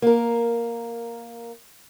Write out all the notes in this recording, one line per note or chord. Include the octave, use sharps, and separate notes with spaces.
A#3 A#4